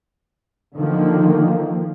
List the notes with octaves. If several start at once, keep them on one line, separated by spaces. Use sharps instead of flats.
D3 D#3 F3 A#3